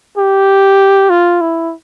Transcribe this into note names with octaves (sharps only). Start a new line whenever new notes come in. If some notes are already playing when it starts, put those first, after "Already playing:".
G4
F4
E4